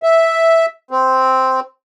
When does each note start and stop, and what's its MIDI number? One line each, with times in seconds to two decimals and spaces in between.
0.03 0.66 76
0.91 1.60 60